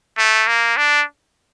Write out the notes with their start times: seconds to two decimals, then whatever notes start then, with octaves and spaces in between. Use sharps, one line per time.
0.18 A3
0.47 A#3
0.77 D4